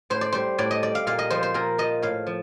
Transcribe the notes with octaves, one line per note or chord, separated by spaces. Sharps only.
A2 C5
D5
G3 C5
A2 D5
D#5
G3 D5
F5
A#2 F5
D#5
F3 C5
C5
A#2 A#4
F3 D#5
A2 F5
F3